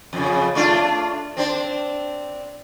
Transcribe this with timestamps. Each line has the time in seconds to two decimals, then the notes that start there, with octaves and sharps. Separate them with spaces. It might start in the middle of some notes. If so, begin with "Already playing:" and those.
0.13 F2 C#3
0.55 A3 D4 F4
1.37 C4 D4 C5